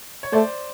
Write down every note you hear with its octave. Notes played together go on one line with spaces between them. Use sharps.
C#5
A3 C5 D5